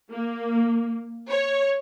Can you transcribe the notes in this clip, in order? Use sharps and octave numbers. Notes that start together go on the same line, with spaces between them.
A#3
C#5